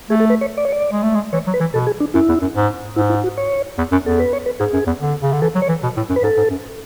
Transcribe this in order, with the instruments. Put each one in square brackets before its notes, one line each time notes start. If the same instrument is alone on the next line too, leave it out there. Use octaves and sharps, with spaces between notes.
[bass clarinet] A3 [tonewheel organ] G#4
[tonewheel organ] A4
B4
C#5
D5
C#5
D5
[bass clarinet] G#3
A3
G#3
[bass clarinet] E3 [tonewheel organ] C#5
[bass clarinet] F#3
[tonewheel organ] B4
[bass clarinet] E3
[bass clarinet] B2 [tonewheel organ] A4
[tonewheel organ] G#4
D4
[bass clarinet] F#2 [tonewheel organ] E4
[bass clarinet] E2
F#2
G#2
[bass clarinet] G#2 [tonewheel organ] E4
[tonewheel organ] E4
F#4
C#5
[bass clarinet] E2
F#2
[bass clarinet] E2 [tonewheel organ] A4
[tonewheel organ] B4
C#5
B4
[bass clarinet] G#2 [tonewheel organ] G#4
[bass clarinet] F#2
E2
D3
C#3
D3
[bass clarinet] E3 [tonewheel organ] A4
[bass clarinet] F#3
[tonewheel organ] C#5
[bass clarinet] E3
B2
A2
F#2
[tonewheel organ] B4
[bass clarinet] G#2 [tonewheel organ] A4
[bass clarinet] G#2
F#2